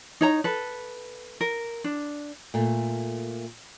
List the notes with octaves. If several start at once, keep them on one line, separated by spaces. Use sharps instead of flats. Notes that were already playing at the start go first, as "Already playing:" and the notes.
D#4 C#5 A#5
A4 B4
A#4
D4
A#2 A3